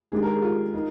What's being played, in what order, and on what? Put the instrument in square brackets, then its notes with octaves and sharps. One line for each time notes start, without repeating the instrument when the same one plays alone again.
[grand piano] D#3 G#3 D4 G4 [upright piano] G#4
[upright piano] A#4
G#4
F4
[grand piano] D#4 A#4